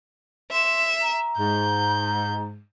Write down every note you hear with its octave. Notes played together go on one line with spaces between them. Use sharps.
E5 C6 E7
A#5
G#2 G6